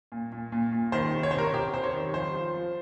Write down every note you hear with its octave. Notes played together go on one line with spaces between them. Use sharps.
A#2
A#2
A#2
A#2
D#3 C5
C3
C#5
C3 C5
A#4
C3 G4
C3 C5
C#5
D#3
F3 C5
F3
F3